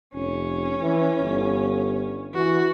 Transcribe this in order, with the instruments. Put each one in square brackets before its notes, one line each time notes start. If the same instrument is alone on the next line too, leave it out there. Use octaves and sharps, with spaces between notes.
[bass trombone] F1 [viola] C#4
[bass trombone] E3
G1
[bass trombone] E3 [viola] F#4